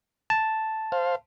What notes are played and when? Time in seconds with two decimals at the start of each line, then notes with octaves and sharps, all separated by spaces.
0.30 A5
0.92 C5 F5